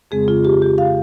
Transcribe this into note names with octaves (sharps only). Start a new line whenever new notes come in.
F2 C#3 G#3 C4 G#4
F4
G4
G4
F5